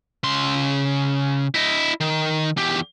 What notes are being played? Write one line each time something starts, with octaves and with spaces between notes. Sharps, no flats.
C#3 C6
E4 D#5
D#3
E2 G4